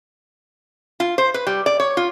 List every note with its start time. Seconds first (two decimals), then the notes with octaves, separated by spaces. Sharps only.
1.00 F4
1.18 C5
1.34 B4
1.47 G3
1.66 D5
1.80 C#5
1.97 F4